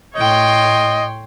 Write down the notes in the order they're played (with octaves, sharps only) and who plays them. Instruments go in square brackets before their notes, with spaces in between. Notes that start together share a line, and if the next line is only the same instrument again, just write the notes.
[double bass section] A2 [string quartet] C#5 G5 C6 [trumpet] D#5